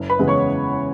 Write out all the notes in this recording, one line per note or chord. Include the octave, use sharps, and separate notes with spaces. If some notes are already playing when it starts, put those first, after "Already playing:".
Already playing: F#1
B4 B5
E2 C#3 G#3 B3
C#5 C#6